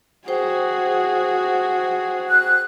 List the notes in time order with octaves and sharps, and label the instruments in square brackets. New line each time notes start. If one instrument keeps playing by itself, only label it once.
[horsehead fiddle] F#4 G#4 [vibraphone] C5 G5
[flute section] F#6